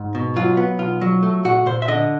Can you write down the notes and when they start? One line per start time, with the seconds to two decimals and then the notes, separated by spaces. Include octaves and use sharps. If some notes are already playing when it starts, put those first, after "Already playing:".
Already playing: G#2
0.15 B2
0.36 F#3 F4
0.57 B3
0.79 B1 F4
1.01 F#3
1.23 A3
1.45 A#2 F#4
1.66 A#2 C5
1.82 E5
1.88 D3 D#5